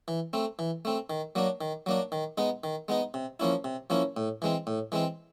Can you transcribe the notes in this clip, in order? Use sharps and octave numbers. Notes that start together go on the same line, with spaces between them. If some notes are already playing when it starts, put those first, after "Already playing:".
E3
A3 C4
E3
A3 C4
D#3
F#3 A#3 D4
D#3
F#3 A#3 D4
D#3
G#3 B3 D#4
D#3
G#3 B3 D#4
C3
F3 A#3 C#4 E4
C3
F3 A#3 C#4 E4
A2
E3 G#3 C4
A2
E3 G#3 C4